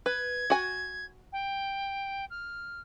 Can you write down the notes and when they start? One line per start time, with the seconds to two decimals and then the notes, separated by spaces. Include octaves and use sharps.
0.06 B4 G#6
0.50 F#4 G#5
1.32 G5
2.30 F6